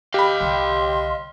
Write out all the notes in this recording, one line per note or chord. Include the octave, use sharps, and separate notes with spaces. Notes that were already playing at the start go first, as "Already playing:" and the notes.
G4 D#5 F5 B5
C2 D3 C6